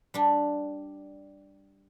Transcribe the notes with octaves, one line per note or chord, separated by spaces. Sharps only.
G3 D4